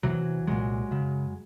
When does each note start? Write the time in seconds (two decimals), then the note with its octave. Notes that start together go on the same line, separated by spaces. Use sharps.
0.03 E2 C3 E3 F#3
0.47 C2 A#2 F#3 G#3
0.91 F#2 C#3